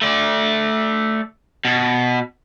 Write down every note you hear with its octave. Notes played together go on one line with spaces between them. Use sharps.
A3 D5
B2